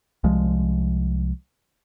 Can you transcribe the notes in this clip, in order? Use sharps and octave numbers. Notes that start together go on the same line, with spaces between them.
C2 F3 G#3